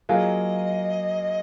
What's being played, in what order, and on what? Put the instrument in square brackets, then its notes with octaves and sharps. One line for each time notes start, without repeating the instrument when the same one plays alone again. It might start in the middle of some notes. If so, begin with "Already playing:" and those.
[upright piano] F#3 A#3 F4 G#4 [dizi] D#5 F5